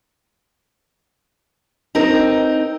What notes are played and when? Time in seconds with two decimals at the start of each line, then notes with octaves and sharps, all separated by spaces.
1.95 C4 D#4 A#4